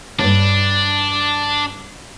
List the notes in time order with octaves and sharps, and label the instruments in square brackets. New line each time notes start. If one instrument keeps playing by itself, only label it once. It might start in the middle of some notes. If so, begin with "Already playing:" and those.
[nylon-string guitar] E2 G2 [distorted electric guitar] D4